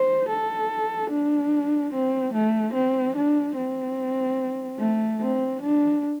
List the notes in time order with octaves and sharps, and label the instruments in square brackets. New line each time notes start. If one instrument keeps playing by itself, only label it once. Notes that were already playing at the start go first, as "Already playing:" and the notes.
Already playing: [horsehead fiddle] C5
A4
D4
C4
A3
C4
D4
C4
A3
C4
D4